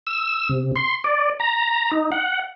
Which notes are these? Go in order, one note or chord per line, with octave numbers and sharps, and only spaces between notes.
E6
C3
C6
D5
A#5
D#4
F#5